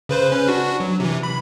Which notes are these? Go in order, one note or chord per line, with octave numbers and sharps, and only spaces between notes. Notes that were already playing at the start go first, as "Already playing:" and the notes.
C#3 B4 C5
C#4 B4
D4 F#4
F#3
C3 E3
B5